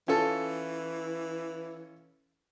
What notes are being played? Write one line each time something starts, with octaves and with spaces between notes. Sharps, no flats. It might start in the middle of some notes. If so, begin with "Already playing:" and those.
E3 C#4 F4 A4